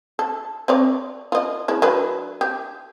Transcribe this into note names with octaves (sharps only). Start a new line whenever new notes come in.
A4
C4 C#5 D5
F4 D#5
G#3 E4
F#3 D4 B4
G4